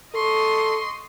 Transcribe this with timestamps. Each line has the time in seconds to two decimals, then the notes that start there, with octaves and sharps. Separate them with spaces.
0.15 A4 D#5 C6 C#6